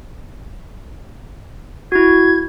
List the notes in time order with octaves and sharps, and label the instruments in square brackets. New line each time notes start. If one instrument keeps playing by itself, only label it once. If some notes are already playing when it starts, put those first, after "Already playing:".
[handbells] E4 F#4 [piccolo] G#6